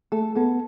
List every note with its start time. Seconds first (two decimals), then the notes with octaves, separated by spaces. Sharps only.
0.12 A3 A4
0.35 B3 A4